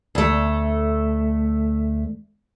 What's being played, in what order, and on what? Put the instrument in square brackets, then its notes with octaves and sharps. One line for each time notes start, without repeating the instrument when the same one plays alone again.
[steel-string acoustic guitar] D2 A3